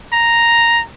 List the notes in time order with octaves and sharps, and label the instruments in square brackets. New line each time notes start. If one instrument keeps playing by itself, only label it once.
[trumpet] A#5